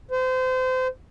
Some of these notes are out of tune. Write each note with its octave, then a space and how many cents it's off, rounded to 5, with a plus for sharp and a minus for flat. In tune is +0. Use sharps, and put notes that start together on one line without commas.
C5 -30